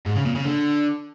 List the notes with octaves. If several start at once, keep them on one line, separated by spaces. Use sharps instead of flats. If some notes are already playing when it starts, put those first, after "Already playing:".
G#2
C#3
A#2
C#3
D3